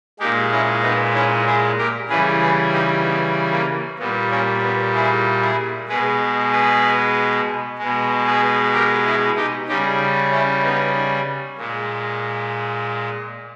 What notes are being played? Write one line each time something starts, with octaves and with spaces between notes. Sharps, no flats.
A#2 G#3 D#4 G4
C#4 E4
B3 D#4
C#4 E4
E4 G#4
G4 A#4
C#3 E3 G3 G#4 B4
G#4 B4
D#4 G4
B3
A#3
A#2 G3 B3
A#3 C#4
B3
E4 G#4
E4 G#4
B2 G#3 G#4 B4
G#4 B4
B2 G#3
G#4 B4
G4 A#4
E4 G#4
D#4 G4
C#3 G3 D#4 G4
C#4 E4
B3 D#4
A#2 G#3